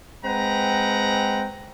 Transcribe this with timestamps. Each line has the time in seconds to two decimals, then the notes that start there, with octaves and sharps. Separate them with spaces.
0.25 G#3 C4 B4 F#5 G5 A#5